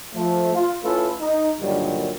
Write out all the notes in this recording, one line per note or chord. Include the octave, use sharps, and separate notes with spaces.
F3 A3
F4
A3 C#4 E4 F4 A4 B4
D#4
G2 A#2 D3 D#3 F#3 G3